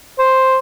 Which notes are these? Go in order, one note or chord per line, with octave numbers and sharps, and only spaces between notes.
C5